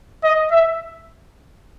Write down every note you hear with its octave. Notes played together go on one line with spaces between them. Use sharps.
D#5
E5